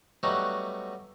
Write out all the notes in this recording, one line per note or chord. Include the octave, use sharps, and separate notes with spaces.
F#3 G3 A3 B3 D#4 F#4